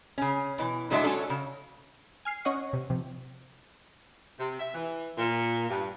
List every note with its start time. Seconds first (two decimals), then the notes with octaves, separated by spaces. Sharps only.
0.18 C#3 C#4
0.58 B2 E3
0.90 A2 D3 F#3 G#3 D4 E5
1.04 F#3 C#4 D4 A4
1.30 C#3
2.25 G#5 F6 C7
2.45 C#4 C#5 D#5 F#5 C#6
2.73 C3
2.90 C3 F3
4.40 C3
4.60 E5
4.74 E3
5.17 A#2
5.69 G2